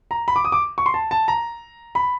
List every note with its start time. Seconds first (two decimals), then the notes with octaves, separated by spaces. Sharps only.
0.11 A#5
0.28 B5
0.36 D6
0.45 D#6
0.52 D6
0.78 C#6
0.86 C6
0.94 A5
1.11 A5
1.28 A#5
1.95 B5